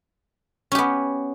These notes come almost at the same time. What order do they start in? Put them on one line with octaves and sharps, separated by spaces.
C#4 G4 B3